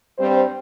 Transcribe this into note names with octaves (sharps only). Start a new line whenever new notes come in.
G2 G3 C4 C5